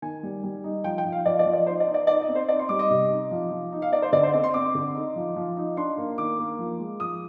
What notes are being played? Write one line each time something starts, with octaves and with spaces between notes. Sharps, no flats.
D#3 G#5
G3
G3
D#4
F3 G5
G5
F3
F5
F3 D5
D5
F3
D5
D#4 C5
D5
D#4
D5
D#4 D5
D#5
C4
C5
D#4 D5
C6
G3 D6
D#5
C3
D#4
F3
F3
D#4
F5
D#4 D5
C5
D3 D5
C5
C4 D5
C6
C4 D6
D3
D#4
F3
F3
D#4
D4 C6
A#3
D#3 D6
A#3
F3
G#3
F3 D#6